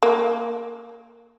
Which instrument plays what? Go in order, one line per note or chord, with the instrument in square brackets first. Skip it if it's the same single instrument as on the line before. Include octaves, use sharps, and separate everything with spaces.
[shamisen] A#3